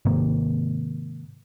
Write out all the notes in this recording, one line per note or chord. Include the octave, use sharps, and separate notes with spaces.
G#2 C3 D#3 A#3